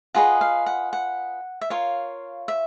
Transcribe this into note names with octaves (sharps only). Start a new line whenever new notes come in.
F4 G#4 B4 D#5 F#5
F5
F#5
F#5
E5
F4 A#4 C#5 F5
E5